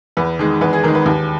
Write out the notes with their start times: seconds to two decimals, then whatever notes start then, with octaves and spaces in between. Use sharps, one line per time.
0.17 E2 B4
0.39 D#3 G#3
0.61 E2 B4
0.73 G#4
0.83 D#3 G#3 A#4
0.95 B4
1.06 D#2